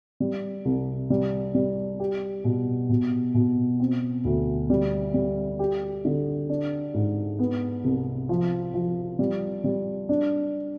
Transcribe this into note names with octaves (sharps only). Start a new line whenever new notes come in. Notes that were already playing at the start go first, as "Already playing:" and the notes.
G3
C2
G3
G3
G4
B2
B2
B2
C4
D2
G3
G3
G4
D3
D4
G#2
B3
C2
F3
F3
G3
G3
D4